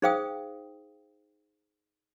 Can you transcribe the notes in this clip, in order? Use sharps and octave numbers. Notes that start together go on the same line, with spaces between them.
D#4 G#4 C5 F5 G5 D#6